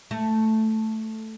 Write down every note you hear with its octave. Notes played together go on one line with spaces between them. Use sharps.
A3